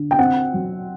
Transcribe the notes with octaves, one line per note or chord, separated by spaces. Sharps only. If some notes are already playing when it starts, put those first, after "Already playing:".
Already playing: D3
G5
C4 F#5
F#3